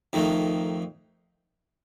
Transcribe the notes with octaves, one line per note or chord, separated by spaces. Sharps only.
F2 D#3 A3 D#4